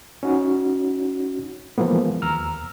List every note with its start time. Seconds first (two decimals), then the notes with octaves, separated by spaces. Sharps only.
0.23 C#4 D#4 F#4
1.78 E3 F3 G#3 A#3 B3
2.22 D#2 A#5 E6 F6